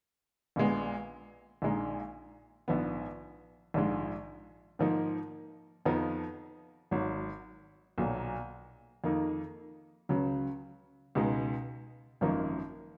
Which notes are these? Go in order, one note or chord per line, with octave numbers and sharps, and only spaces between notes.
A#1 A#2 G#3 B3
A#1 A#2 G#3 D#4
A#1 G#2 F3 B3
A#1 G#2 F3 G#3
G#2 F3 A#3 D#4
F2 F3 B3 D#4
G#1 G#2 F#3
B1 A#2 F#3
F2 D#3 A#3 D#4
C#2 C#3 F#3
C#2 B2 G#3 D#4
G#1 F#2 F3 A#3 D#4